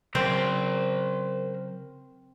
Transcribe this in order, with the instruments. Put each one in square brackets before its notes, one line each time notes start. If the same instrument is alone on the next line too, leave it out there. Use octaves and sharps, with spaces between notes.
[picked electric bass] C#3 F#3 [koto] C4 [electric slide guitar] A#4 C5